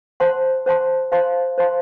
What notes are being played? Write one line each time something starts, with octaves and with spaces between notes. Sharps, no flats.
C5 F#5 A5 C6
C5 F#5 A5 C6
C5 F5 A5 C6
C5 F5 A5 C6